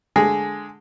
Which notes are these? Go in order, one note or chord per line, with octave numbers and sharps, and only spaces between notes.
D3 G#3 G#4